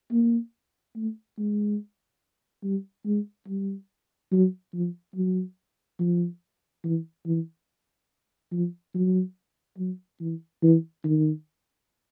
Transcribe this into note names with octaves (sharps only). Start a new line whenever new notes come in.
A#3
A3
G#3
G3
G#3
G3
F#3
F3
F#3
F3
E3
E3
F3
F#3
F#3
E3
E3
D#3